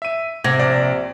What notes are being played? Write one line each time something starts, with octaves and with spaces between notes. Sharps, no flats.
E5 D#7
C3 G#6 A#6
A#1 D5 A#6